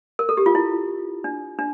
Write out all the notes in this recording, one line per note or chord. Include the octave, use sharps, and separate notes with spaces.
A#4
A4
G4
F4
E4
D4
D4